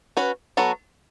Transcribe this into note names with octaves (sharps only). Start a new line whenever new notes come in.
C#4 F#4 B4
F#3 B3 F#4 A4